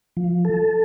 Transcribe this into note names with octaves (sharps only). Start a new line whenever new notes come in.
F3
A4